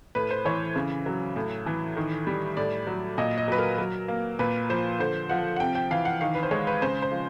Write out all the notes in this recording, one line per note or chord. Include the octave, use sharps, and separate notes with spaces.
A2 B4
C5
E3 C#5
C#3
F#3
A2
E3
D#3
G3
A2 D5
F#3
A#2 D#5
D#5
F#3 B4
A#4
F#3
A#3
A#2 B4
F3 C5
D3 C5
F3 F#5
F#5
C3 G5
G5
E3 F5
F#5
D#3 F5
B4
C5
G#3 C#5
B4
C#3 C5
C5
F3